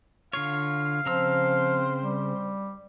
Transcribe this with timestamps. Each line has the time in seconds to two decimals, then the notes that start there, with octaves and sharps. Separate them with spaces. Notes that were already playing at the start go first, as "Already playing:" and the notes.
0.33 D3 F4 C#5 F5
1.06 C#3 F3 C4 C5 A#5 E6
2.02 G3